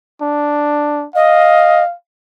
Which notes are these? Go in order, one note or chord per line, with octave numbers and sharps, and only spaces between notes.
D4
D#5 F5